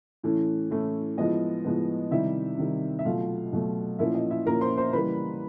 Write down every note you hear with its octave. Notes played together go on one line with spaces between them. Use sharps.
A2 E3 A3 C#4
A2 E3 A3 C#4
A2 F3 G#3 B3 D#5
A2 F3 G#3 B3
C3 D#3 G3 E4 E5
C3 D#3 G3
E5
B2 F#3 A3 F4 F5
B2 F#3 A3
A#2 F3 A#3 C#4 E4 E5
D#5
E4 E5
A#2 F3 A#3 C#4 A#4 A#5
C5 C6
C5 C6
C#3 E3 G3 A#3 B4 B5